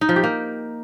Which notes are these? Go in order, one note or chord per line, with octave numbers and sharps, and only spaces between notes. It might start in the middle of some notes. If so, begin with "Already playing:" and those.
D#4
F3
G4
A#3